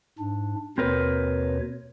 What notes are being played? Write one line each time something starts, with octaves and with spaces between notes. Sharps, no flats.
G#2 D4
D#2 B2 C4 A#4 B4 C#5